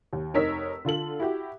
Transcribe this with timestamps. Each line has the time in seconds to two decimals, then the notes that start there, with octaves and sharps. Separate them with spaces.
0.13 D#2
0.34 F1 D#4 A#4 C#5 E6 B6
0.85 D3 F4 A4 F#7
1.20 E4 F#4 G4